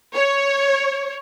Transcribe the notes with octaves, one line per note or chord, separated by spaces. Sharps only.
C#5